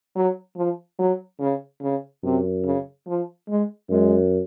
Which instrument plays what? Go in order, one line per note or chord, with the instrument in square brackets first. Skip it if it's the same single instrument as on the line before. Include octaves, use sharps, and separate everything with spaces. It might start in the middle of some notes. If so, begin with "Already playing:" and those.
[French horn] F#3
F3
F#3
C#3
C#3
[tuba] F#2 [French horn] C3
[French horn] C#3
F3
G#3
[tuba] F#2 [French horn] G#3